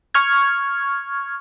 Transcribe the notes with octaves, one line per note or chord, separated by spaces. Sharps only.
C#6 F6 G#6